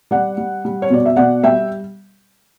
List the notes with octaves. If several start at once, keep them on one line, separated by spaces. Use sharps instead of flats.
G3 D5 F#5
G3
G3
C#5
B2 D5
E5
B2 D5 F#5
G3 E5 G5